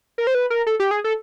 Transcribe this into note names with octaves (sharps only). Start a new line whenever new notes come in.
A#4
C5
B4
A#4
A4
G4
G#4
A4